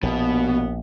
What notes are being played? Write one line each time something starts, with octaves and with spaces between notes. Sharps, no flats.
A#1 D#2 B2 B3